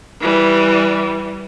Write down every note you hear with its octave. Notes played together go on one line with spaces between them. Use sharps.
E3 G3